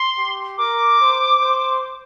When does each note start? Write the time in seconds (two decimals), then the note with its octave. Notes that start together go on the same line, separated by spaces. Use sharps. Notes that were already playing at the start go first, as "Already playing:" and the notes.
Already playing: C6
0.16 G4
0.58 A#4 D6
0.99 C5
1.40 C5